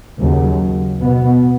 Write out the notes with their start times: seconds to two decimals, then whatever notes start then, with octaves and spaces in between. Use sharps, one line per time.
0.19 D#2 C#3 F#3
1.00 B2 B3